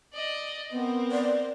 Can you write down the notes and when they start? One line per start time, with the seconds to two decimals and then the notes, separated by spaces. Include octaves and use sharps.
0.13 D5 D#5
0.72 B3 C4 A#4
1.12 D5